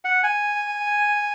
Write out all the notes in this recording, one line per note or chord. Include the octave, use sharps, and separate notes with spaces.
F#5
G#5